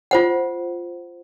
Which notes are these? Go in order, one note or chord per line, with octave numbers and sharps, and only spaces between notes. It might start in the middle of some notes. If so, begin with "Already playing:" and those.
F4 C5 F#5